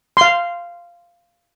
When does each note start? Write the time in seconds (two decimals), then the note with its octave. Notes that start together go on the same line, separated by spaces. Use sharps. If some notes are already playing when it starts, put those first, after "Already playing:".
0.17 F5 C6